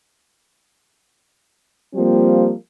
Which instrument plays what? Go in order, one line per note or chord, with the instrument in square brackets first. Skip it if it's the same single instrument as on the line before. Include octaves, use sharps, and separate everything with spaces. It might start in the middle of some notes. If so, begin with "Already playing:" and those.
[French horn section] F3 G3 A#3 C4